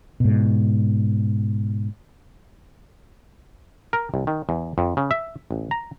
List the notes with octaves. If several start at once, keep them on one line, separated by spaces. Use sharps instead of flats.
G#2 B2
A#4
C2
D#3
E2
F2
C#3
E5
A1
A#5